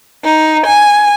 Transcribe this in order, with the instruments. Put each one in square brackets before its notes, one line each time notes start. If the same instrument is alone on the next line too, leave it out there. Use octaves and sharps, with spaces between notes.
[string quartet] D#4
G#5